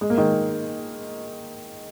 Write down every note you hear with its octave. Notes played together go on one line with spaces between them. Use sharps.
G#3
A#3
D#3 G#3